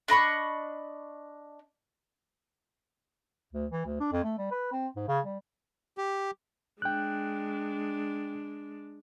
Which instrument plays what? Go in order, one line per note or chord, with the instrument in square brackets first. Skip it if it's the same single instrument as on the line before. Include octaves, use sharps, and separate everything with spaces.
[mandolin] D4 D#5 B5 C#6
[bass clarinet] D2
E3
D2
D4
F2
A3
G3
B4
C4
G#2
C#3
G3
[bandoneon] G4
[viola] G#3 D4 [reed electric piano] G5 F#6